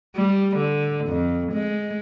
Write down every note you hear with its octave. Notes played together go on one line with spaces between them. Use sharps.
G3
D3
F2
G#3